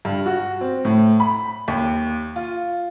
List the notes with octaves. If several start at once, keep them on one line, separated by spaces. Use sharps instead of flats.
G2
F#4
C4
A2
B5
D#2
F4